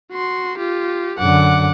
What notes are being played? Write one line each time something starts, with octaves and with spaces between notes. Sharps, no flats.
F#4 C6
F4 G4
F#2 D3 F#5 D6